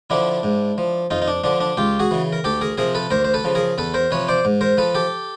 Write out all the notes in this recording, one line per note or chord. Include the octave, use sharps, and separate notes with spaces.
D3 F3 D4 E4
G#2
F3
F2 D#4 F4
D#4
D4
D3 F3 D4
D4
C#2 F4 G4
F#4 G#4
C#3 E3
A#4
D2 G4 A4
G#4 A#4
C3 F3 G#4 A#4
A4 B4
D2 A#4 C5
C5
A4 B4
C#3 F3
G#4 A#4
E2 A4 B4
A#4 C5
C3 F3 B4 C#5
C5 D5
G#2
A#4 C5
F3 A4 B4
G4 A4